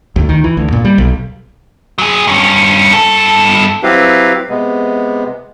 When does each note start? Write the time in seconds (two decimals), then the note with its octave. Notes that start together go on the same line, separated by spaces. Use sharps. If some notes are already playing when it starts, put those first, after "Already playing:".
0.16 D2
0.29 D#3
0.44 E3
0.57 D2
0.73 A#2
0.85 G3
0.98 B1
1.98 F#3 G#4
2.27 G2 C#4
2.93 G2 A4
3.83 F#3 C4 E4 G4 B4 F5
4.49 C3 G#3 B3